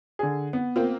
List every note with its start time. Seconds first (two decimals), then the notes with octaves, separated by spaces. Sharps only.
0.19 D3 G#4
0.53 B3
0.76 A#3 C4 F4